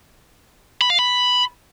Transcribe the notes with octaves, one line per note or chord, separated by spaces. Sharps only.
B5
F5
B5